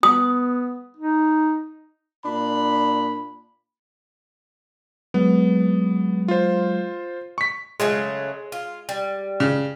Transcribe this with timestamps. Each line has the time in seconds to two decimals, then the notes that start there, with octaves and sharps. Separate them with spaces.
0.03 B3 D#6
0.97 D#4
2.25 A#2 D4 B5
5.14 F#3 G#3 B3
6.28 F4 C5
7.38 C#6 B6
7.80 C#3 F#3 G#3 A3
8.52 F4
8.89 G3
9.40 C#3